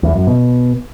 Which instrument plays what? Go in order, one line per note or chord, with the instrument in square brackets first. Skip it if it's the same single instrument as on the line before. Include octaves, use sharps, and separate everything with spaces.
[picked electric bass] E2
F#2
B2